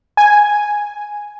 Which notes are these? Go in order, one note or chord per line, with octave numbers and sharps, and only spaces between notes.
G#5